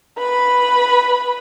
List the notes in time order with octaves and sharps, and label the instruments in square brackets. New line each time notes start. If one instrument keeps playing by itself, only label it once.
[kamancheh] B4 B5